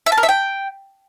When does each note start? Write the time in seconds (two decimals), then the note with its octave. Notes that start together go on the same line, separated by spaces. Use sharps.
0.06 E5
0.12 A5
0.17 A#4
0.23 E5
0.29 G5